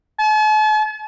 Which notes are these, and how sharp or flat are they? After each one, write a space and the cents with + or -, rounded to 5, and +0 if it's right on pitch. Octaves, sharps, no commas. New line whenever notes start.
A5 -45